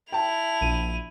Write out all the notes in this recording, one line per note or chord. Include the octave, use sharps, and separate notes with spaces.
E4 G5 A5 F7
A#1 D#7